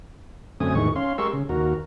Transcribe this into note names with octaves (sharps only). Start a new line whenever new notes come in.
F#2 D3 A3 C4 G#5 D#6
E2 A2 D#3 G#3 C#6
C#4 F5 C6
G#3 G4 A#4 C6 C#6 E6
C#3
D#2 F#4 A#4